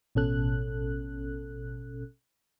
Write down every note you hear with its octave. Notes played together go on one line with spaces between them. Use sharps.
A1 B2 C#4 A4 F#6